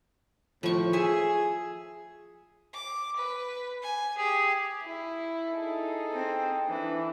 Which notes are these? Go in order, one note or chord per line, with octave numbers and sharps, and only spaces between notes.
A2 F3 C#6
G#4 E5 G#5
D6
B4
G#5
G4 G#4
E4
D#4 G#4 A4
C4
E3 D4